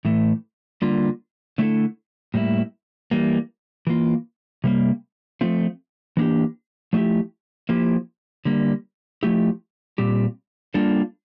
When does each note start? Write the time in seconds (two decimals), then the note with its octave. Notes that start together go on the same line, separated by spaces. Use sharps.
0.05 A2 E3 A3
0.82 D3 G3 A#3 F4
1.58 D3 A3 E4 A4
2.34 A2 G3 A#3 E4
3.11 E3 G3 A#3
3.87 E3 A#3 F4
4.64 C3 G3 A#3
5.41 F3 A3 C4 F4
6.17 E3 A#3 D4 G4
6.93 F3 A3 E4 G4
7.69 F3 A#3 E4 G4
8.45 D3 G3 A#3
9.23 F3 A3 E4 G4
9.98 A#2 G3 C4 G4
10.74 G3 A#3 D4 F4 A4